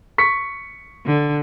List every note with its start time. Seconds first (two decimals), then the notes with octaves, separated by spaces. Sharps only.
0.18 C#6 B6 C#7
1.06 D3